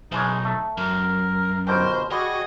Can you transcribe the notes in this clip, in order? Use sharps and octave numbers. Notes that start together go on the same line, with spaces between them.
B1 E3 G#3 C#4 D#4
A3
F#2 A#4
G1 B2 A#4 C5 G5
G3 F#4 G#4 D#5